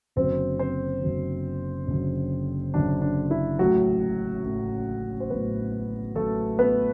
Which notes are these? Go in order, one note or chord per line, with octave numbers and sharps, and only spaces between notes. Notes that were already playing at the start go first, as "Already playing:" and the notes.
F#1 F#2 D3 F#3 C4 C5
C4 C5
F#1 F#2 D3 F#3
F#1 F#2 D3 F#3
F#1 F#2 D3 F#3 D4
D4
E4
A1 A2 F#3 F#4
A1 A2 F#3
C5
A1 A2 F#3 B3 B4
A1 A2 F#3 A3 A4
B3 B4